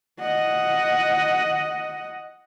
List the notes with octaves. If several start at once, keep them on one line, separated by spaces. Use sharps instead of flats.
D#5 F#5